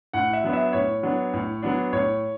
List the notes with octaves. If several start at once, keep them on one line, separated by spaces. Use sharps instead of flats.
A2 F#5
E5
F#3 B3 D4
E5
A2 C#5
F#3 B3 D4
A2
F#3 B3 D4
A2 C#5